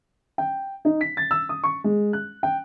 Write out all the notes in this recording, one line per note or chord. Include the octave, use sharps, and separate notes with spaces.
G5
D#4
B6
A6
E6
D#6
C#6
G#3
F#6
G5